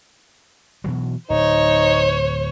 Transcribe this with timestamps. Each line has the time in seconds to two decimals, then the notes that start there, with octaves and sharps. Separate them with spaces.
0.84 B2 E3 F#3
1.30 D1 D#4 C5 C#5